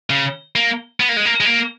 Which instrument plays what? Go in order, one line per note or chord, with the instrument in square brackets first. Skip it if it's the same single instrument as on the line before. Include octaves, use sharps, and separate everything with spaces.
[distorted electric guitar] C#3
A#3
B3
A#3
G#3
A#3
G#3
A#3